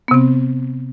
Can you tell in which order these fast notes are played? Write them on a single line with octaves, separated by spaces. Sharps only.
B3 C3 C4